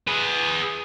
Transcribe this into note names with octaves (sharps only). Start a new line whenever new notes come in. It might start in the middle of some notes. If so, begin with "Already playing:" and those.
G#4 B4